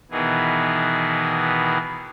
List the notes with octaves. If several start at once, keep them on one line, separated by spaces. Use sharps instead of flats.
B2 D#3 E3 B3 G#4